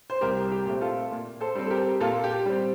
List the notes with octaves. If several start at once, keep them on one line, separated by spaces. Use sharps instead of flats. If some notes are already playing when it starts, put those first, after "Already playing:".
C5
C2 G4 A#4
G4
A#2 A3 C4
F4 A4
A#2
A4 C5
G3 C4
A4
G4 A#4
A#2 F4 A4
G4
G3 C4